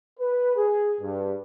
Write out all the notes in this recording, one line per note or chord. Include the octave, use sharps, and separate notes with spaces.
B4
G#4
G2